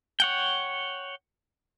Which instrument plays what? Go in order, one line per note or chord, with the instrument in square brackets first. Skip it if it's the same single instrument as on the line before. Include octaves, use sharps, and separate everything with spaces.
[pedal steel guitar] C#5 F#5 G5